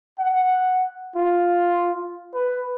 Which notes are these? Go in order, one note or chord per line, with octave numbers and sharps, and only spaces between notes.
F#5
F4
B4